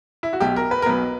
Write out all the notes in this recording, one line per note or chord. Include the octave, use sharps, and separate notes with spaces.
E4
F#4
B1 B2 G4
A#4
B4
A#4
B1 B2 B4